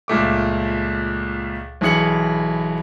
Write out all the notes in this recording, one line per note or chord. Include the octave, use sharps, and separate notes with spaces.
C#2 A#2 A3 D6
B1 E3 G#4 C#7 F#7